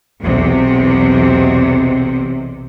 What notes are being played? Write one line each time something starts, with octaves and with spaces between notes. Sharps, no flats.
B1 E2 C3